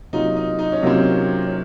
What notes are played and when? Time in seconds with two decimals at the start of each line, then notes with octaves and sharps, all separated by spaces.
0.13 C3 F#3 A#3 D#4 F4
0.37 D#4
0.59 D#4
0.72 C#4
0.82 C3 F#3 A#3 C4 F4
1.00 C#4
1.47 C#4